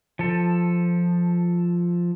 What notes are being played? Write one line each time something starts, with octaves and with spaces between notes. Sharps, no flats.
F3 A4